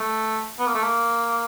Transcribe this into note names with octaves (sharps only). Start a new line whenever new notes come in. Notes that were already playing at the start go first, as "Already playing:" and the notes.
Already playing: A3
B3
A#3
A3
A#3